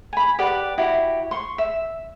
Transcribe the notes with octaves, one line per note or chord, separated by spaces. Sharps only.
G#5 B5
G4 B4 D5 F#5
E4 F#4 G4
C6 C#6
E5